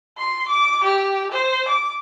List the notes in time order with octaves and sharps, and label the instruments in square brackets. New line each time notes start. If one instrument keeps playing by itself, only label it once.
[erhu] C6
D6
G4
C5
D6